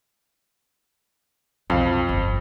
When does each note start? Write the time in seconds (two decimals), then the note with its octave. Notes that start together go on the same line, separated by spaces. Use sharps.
1.70 B1 F2 F5
2.09 G1